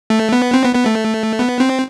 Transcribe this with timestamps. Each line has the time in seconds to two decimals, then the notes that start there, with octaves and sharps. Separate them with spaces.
0.10 A3
0.32 B3
0.54 C4
0.64 B3
0.75 B3
0.86 A3
1.39 B3
1.60 C4